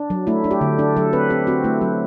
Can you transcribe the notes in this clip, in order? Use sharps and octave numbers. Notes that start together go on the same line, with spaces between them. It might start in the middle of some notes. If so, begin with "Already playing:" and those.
Already playing: D4
F#3
A3 E4
D4
G4
D3
D4
F#3 A4
C4 B4
C4 G4
C4 F#4
A3 E4
F#3